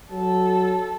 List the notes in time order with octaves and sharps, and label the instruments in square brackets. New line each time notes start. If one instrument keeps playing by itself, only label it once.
[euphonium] F#3 [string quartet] A4